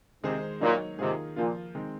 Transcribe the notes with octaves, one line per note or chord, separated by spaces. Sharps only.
G#2 C3 D#3 G#3 D#4 G#4 C5
A#2 F#3 A#3 D#4 A#4 C#5
G#2 C3 D#3 A#3 F4 G#4
A#2 F3 A#3 F4
D#3 G#3 C4